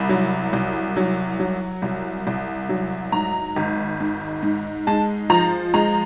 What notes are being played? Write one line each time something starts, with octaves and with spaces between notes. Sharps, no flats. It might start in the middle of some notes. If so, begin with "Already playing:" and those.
Already playing: C2 B5
F#3
C2
F#3
F#3
C2
C2
F#3
G#2 A#5
G#1
G#2
G#2
G#3 A5
F3 A#5
G#3 A#5